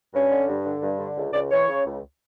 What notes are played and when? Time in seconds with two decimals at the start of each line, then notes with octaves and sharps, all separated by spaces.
0.13 G2 C#4
0.30 D3
0.48 G2
0.65 D3
0.82 G2
0.99 D3
1.16 C#2
1.33 C#2 D5
1.51 E3 C#5
1.68 C#3
1.85 C#2